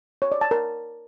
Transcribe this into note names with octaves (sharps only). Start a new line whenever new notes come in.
C#5
D5
A5
A#4